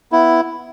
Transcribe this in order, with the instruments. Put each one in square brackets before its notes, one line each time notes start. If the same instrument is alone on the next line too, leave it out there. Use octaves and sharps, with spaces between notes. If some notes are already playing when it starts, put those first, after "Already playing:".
[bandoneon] B3 E4